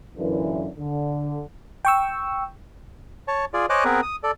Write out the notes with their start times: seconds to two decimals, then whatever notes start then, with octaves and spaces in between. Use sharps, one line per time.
0.18 F#2 A#2 D3 E3
0.78 D3
1.85 G5 C#6 E6
3.28 C#5 A5
3.54 F4 G#4 D5
3.70 C5 C#5 D#5 G#5 D6 F#6
3.85 B3 C4 G#4 A#4 B4
4.02 D#6
4.23 A4 D5